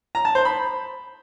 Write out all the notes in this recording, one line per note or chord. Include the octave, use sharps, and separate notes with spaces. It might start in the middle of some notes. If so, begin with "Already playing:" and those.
A#5
A5
C5
B5